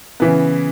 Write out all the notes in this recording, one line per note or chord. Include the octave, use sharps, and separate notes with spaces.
C#3 E3 B3